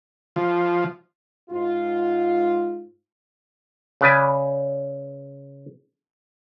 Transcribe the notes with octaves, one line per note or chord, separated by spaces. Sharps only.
F3
G#2 F4
C#3 B4 D5 G#5